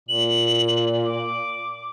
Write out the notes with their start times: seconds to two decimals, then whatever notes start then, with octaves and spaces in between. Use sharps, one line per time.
0.09 A#2 F#7
1.05 D6